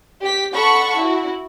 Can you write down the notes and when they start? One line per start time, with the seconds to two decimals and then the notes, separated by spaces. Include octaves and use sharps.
0.22 G4 B6
0.54 A4 F#5 A5 B5 C#6
0.98 E4 F#4